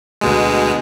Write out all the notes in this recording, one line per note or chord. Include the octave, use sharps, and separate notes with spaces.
D2 B2 G#3